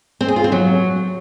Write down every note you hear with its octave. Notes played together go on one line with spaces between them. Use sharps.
C4
G#4
F4
C4
F#3